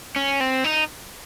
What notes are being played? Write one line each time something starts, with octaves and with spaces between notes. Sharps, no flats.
C#4
C4
D#4